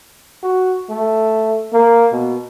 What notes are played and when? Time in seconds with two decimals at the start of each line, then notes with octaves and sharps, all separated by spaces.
0.43 F#4
0.90 A3
1.73 A#3
2.12 B2